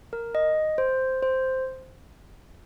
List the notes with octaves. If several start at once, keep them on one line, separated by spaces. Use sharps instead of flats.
A#4
D#5
C5
C5